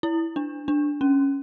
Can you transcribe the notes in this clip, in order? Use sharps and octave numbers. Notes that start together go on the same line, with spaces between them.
E4
D4
D4
C#4